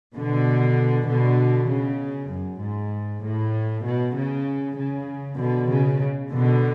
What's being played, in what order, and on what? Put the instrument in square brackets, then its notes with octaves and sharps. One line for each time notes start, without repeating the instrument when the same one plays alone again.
[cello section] B2 D3
B2 D3
C#3
F#2
G#2
A2
B2
C#3
C#3
B2 D3
C#3
B2 D3